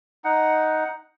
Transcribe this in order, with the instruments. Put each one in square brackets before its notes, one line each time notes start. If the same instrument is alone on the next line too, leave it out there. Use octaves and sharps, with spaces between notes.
[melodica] D#4 F#5